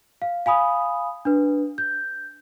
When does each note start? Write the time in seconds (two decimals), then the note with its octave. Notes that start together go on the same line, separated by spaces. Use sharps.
0.22 F5
0.46 F5 G#5 B5 D#6
1.25 D4 B4
1.78 G6